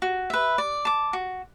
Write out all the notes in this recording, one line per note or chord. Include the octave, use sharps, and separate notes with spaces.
F#4
B4 E5
D5
A5 D6
F#4